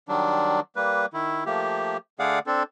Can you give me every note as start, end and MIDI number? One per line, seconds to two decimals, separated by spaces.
0.09 0.60 51
0.09 0.60 54
0.09 0.60 55
0.09 0.60 62
0.76 1.06 55
0.76 1.06 58
0.76 1.06 71
1.14 1.44 51
1.14 1.44 64
1.46 1.97 53
1.46 1.97 57
1.46 1.97 58
1.46 1.97 67
2.19 2.39 50
2.19 2.39 57
2.19 2.39 68
2.19 2.39 74
2.19 2.39 77
2.19 2.39 78
2.47 2.63 60
2.47 2.63 62
2.47 2.63 69